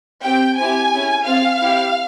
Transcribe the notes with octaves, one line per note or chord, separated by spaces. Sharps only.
C4 G4 G5
C4 E4 G4 G#5
C#4 E4 G#4
C4 F4 G#4 F5
C4 E4 G4